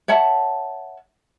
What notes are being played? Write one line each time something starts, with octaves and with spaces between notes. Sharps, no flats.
C#5 E5 F#5 A5